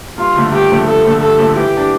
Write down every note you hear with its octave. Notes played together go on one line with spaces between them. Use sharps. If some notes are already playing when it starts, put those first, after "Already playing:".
G2 F4
D3 F3 A3
G2 G4
D3 F3 A3
G2 A4
D3 F3 A3
G2 A4
D3 F3 A3
E3 G4
G3 D4